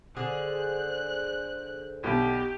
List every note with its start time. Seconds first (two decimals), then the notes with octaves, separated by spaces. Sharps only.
0.17 D3 G#4 C5 D5 F#6
2.04 B1 B2 G4